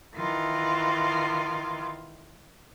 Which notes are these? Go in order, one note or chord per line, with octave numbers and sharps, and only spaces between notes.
D#3 E3 F4